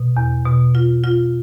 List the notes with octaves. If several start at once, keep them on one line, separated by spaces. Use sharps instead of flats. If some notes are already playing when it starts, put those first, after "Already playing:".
Already playing: B2
E2
B2
F4
F4